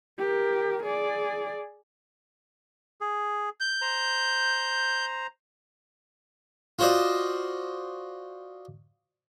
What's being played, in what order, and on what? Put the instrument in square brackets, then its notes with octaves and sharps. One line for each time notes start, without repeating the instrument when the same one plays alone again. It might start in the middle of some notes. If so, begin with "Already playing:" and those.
[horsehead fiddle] G4 A#4
G#4 D5
[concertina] G#4
[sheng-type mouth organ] G6
[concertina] C5 A#5
[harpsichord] F4 F#4 C5 D5 D#5